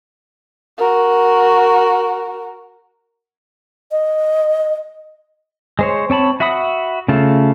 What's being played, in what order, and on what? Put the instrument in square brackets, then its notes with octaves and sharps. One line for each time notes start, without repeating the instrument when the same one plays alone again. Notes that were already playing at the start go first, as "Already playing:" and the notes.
[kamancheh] F#4 A#4
[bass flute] D#5
[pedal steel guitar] G#3 C5 C#5
C4 C#5 A5 B5
F#4 E5 F#5 B5 D#6
C#3 A3 F4 A4